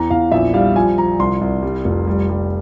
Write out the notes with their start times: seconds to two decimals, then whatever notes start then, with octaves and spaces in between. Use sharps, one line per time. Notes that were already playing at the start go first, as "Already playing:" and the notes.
Already playing: E2 A#5
0.10 E2 F5
0.32 A#1 E5
0.54 G3 F5
0.75 F3 G#5
0.98 F3 A#5
1.19 C2 C6
1.41 C2
1.63 G3
1.85 F1
2.07 G3
2.29 G3